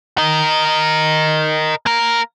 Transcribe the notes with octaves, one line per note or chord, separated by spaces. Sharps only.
A#4 D#5
A#3 A#4